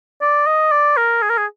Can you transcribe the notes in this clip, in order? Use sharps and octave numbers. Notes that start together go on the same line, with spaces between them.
D5
D#5
D5
A#4
G#4
A#4
G#4